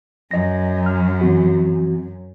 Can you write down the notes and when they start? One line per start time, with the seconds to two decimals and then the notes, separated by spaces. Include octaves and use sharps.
0.31 F#2 D#5 A#6
0.86 F6
1.21 E3 C4 F#4